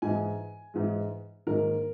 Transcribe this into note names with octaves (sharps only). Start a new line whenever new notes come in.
G#2 E3 G#3 G#5
G#2 E3 G#3
G#2 D#3 A#3 A#4